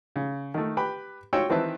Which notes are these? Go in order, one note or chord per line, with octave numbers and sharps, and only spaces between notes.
C#3
D#3 A3
G4 B4 G5 B5
F4 F#4 C#5 G5 E6
D#3 E3 C4 B4 E5 A5